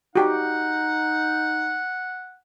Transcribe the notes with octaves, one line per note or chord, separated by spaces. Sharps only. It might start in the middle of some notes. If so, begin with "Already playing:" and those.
D#4 F#4 G4 F#5